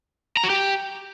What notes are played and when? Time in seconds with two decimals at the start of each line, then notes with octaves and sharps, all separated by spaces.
0.37 A#5
0.43 F#4
0.50 G4